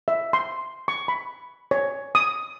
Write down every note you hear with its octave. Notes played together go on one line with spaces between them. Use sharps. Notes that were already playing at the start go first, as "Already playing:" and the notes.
E5
C6
C#6
B5
C#5
D#6